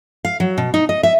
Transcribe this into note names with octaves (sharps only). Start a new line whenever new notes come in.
F5
F#3
B2
D#4
D#5
E5